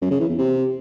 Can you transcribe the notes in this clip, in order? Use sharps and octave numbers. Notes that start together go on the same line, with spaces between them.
F#2
C#3
E3
E2
C3